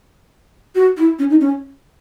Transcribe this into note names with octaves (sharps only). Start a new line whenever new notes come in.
F#4
E4
C#4
D#4
C#4